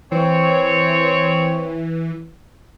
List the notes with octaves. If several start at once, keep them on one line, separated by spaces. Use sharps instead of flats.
E3 C4 C#5